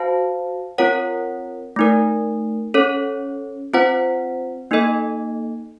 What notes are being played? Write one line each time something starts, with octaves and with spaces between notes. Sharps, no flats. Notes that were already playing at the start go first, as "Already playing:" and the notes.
Already playing: F#4 C5 F5 A5
C4 F4 A#4 C#5 F#5
A3 D#4 A#4
C#4 A4 C#5
C4 F4 C5 F#5
A#3 D#4 A4 D#5